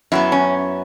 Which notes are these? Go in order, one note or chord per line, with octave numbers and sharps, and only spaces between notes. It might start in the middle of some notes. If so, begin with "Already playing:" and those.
F#2 F#3 B3 E4
C#4